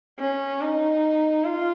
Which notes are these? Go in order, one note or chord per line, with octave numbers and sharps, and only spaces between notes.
C#4
D#4
F4